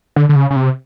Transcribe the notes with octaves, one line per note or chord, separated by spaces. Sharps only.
D3
D3
C#3
C#3
C3